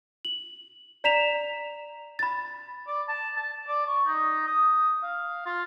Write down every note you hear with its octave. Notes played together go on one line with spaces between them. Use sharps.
F#7
D5 A#5 B6 E7 F7
B5 A6
D5
A5
A5
D5
C#6
D#4
D#6
F5
F4